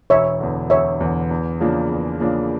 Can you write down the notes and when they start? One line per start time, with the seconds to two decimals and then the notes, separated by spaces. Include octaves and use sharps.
0.10 E1 C#5 E5
0.40 E2 D3
0.70 E1 C#5 E5
1.00 E2 D3
1.31 E2
1.61 C#3 F3 A#3 D4
1.90 E2
2.20 C#3 F3 A#3 D4